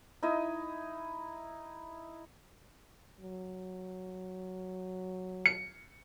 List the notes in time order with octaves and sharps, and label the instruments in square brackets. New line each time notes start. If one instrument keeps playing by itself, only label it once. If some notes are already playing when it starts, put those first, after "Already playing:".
[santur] D#4 E4 D#5
[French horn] F#3
[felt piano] C#7